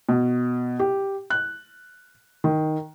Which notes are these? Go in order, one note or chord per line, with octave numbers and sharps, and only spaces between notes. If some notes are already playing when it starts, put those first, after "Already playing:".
B2
G4
F#6
D#3